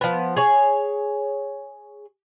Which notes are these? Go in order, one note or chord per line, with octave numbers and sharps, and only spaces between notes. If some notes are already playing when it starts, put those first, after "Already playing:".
F3 B3
G#4 C#5 G#5